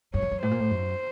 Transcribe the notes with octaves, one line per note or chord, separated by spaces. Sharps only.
F#2 C#5
F2
F#2
A2 C5
A#2
A2
F#2